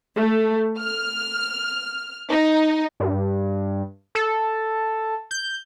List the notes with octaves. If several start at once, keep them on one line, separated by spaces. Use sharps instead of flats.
A3
F6
D#4
G2
A4
G6